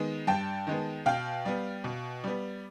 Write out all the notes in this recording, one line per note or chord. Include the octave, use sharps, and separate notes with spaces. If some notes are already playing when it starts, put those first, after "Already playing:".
Already playing: D#3 G#3 B3
G2 G5 A5
D#3 G#3 B3
B2 F5 G5
G3 B3
B2
G3 B3